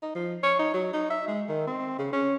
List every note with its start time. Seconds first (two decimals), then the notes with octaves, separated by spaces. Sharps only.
0.02 D#4
0.15 F3
0.43 C#5
0.59 D#4
0.74 F#3
0.93 D#4
1.10 E5
1.28 G#3
1.49 D#3
1.67 C4
1.98 C#3
2.13 C#4